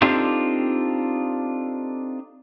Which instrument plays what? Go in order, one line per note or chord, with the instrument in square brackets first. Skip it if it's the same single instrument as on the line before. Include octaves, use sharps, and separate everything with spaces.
[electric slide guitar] C4 D4 D#4 F4 G4 A4